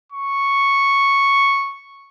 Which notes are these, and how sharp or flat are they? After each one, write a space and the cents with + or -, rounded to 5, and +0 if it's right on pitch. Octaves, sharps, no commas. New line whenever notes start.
C#6 +0